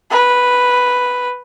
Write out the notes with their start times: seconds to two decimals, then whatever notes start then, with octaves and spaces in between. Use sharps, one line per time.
0.10 B4